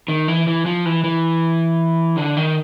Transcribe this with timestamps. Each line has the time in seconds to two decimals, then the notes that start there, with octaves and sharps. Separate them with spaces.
0.08 D#3
0.28 E3
0.47 E3
0.66 F3
0.85 E3
1.04 E3
2.17 D3
2.37 D#3